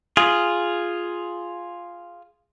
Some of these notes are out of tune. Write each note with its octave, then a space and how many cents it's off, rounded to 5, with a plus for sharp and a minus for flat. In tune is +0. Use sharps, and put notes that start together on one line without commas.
F4 +0 G#4 +0